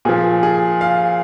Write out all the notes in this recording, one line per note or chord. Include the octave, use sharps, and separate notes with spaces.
A#2 F3 G#4
G#4
F5